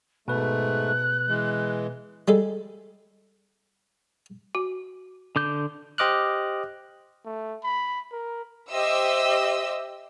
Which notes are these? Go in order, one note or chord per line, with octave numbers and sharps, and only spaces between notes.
G#2 B2 A3 B4 F#6
E3 G#3
G3 G#3 A4
F#4
D3 D6 G6
G4 C5 D#5 D6 F6 F#6
A3
B5
A#4
G4 C5 D#5 E5 E6